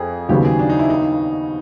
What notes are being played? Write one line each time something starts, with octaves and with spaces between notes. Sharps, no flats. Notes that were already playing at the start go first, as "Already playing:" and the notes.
Already playing: F2 G#4
D#2 C#3 F#3 B3 G4
G#4
D4
D#4
E4
D#4